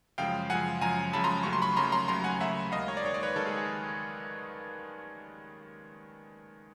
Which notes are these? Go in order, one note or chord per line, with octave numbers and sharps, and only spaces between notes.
F#2 C#3 F3 G#3 F5 G5
F#2 C#3 F3 G#3 F#5 G#5
F#2 C#3 F3 G#3 G#5 A#5
F#2 C#3 F3 G#3 A5 B5
A#5 C6
D#2 C#3 F#3 A3 C#6
C6
B5 C#6
D#2 C#3 F#3 A3 A#5 C6
A#5 C6
D#2 C#3 F#3 A3 A#5 C6
F#5 G#5
D#2 C#3 F#3 A3 E5 F#5
D#2 D#3 G#3 D#5 F5
C#5
D5
D#2 D#3 G#3 C#5
D5
B4 C#5
D#2 D#3 G#3 A4
G#4
G#4